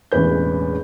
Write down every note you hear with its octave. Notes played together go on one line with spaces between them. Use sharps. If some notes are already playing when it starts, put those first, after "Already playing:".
E1 A1 E2 E3 B4 G6